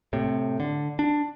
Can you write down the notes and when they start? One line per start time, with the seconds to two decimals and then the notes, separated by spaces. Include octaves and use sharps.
0.13 A2 C3
0.60 D3
0.99 D4